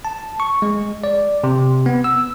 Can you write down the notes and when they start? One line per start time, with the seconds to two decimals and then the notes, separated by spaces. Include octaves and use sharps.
0.05 A5
0.40 C#6
0.62 G#3
1.04 D5
1.44 C3
1.86 B3
2.04 E6